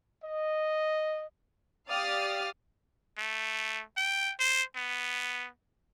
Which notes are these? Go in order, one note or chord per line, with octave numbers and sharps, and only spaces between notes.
D#5
G4 D5 F5 D#6 F6 A6
A3
G5
C5
B3